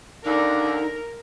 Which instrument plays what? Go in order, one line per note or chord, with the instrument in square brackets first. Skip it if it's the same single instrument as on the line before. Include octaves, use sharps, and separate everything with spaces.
[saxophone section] D#2 D3 [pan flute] D#4 [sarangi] A#4